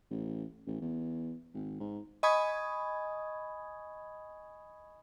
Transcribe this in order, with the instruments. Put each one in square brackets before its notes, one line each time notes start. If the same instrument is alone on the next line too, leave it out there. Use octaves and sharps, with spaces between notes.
[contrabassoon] A1
A1
E2
G#1
G#2
[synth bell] D#5 G#5 B5 C#6 D#6 G#6